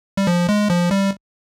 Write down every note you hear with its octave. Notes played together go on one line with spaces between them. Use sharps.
G3
F3
G#3
F3
G3